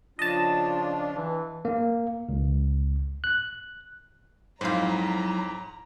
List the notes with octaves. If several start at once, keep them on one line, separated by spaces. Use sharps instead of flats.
C#3 F3 D4 F4 D#5 A5
E3
A#3
C#2
F#6
F2 G#2 F#3 E4 C5 F5 A#5